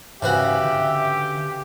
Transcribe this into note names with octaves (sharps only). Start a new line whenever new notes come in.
G#2 C#3 E3 F#4 G4 E5
D3